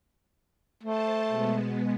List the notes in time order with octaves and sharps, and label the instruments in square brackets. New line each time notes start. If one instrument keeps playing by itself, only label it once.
[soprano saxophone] A3 [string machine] C5 A5
[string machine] B2 G#3 B3